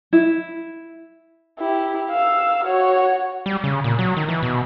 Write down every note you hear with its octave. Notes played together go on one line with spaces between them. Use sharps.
E4
E4 G4
F5 E6
F#4 C#5
G3
C#3
A#2
F#3
D#3
E3
B2